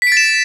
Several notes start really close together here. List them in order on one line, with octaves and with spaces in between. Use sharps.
B6 D7 A6 E7